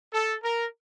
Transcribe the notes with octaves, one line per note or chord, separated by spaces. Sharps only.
A4
A#4